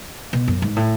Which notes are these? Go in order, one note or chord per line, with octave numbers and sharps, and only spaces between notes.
B2
F#2
G#2
A2